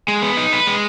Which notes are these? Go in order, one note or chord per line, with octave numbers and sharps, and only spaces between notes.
G#3
B3
D#4
B4
G#3